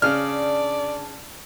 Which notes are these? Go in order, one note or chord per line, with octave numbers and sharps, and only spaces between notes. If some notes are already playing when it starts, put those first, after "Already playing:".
C#3 D4 D5 F6